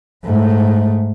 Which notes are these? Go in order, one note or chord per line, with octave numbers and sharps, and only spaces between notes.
G#2 A3